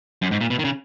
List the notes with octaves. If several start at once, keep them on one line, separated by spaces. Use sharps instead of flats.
F#2
G#2
A#2
B2
D#3
C#3